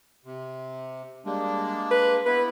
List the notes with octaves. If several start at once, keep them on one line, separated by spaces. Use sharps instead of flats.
C3
G3 G#3 A#3 D4
B4
B3 E4 B4